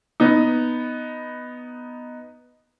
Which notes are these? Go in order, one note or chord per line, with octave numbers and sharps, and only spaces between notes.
B3 D#4